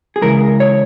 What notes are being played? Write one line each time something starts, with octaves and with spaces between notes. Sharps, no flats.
G#4
C#3 E3 G#3 A#4
C#5